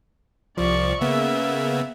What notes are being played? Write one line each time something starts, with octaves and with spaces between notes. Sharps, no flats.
C2 F3 D5 C#6
C#3 A#3 B3 E5